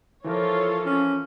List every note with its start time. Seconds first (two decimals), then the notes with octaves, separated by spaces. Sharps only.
0.24 E3 F3 F4 A4 A#4 C#5
0.86 C#4